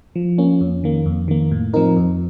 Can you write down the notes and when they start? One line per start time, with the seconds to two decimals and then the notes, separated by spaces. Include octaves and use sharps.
0.16 F3
0.38 A#3 C#4
0.61 F2
0.84 D#3 A#3
1.06 F2
1.28 D#3 A#3
1.51 A2
1.74 F3 C4 D#4 A#4
1.97 F2